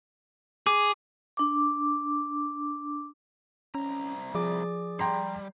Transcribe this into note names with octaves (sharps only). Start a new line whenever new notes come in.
G#4 D6
D4 D6
C2 C#4 A#5
F3 G#4 D5 D6
G3 G5 A#5 C6